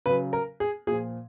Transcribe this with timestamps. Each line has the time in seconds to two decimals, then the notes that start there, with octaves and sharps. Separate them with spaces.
0.06 C#3 F#3 B4
0.33 A#4
0.60 G#4
0.87 A#2 G#4
0.91 F3